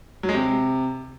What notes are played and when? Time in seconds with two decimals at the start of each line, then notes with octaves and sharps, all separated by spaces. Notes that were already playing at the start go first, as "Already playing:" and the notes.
0.23 F#3
0.29 G#3
0.34 C3